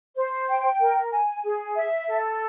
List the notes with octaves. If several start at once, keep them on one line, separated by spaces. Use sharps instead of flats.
C5
G5
A#4
G#5
G#4
E5
A4